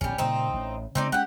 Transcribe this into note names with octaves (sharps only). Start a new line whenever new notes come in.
D1 A#1 G3 C4 C#4
A#2 C#3 G3 C4 D#4
A1
C#3 G#3 B3 C4 D#4 D5
G#3 A#3 C#4 G4 F#5